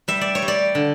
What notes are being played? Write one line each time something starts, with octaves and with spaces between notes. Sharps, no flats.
G3 E5
D5
C#5
G3
D5
D3